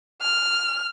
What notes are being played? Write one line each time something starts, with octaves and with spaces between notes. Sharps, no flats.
F6